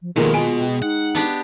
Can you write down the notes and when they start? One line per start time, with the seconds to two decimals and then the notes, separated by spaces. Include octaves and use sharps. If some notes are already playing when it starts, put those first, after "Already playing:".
0.02 F3
0.16 B2 D#3 F3 G#3 A#3 A4
0.34 F4 G#5 D7
0.59 G5
0.82 D#4 F#5
1.15 B3 D4 G4